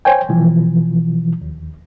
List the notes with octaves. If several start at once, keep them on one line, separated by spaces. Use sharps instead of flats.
C5 C#5 G5 G#5
B2 E3 F3
D#2